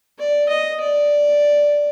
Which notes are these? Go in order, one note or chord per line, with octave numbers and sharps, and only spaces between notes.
D5
D#5
D5